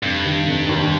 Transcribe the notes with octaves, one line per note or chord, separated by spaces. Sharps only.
F1 G2
D#3
F1
D#2